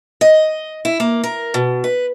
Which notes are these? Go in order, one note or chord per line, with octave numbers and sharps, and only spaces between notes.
D#5
E4
A#3
A#4
B2
B4